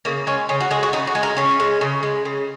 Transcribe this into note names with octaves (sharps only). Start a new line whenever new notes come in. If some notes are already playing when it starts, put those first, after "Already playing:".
C#3 A#3
G#3 C#4
C#3 C#4
F#4
G#3 G#4
F#4
C#3 D#4
F#4
G#3
A#4
C#3 C#4
G#3
C#3
G#3
C#3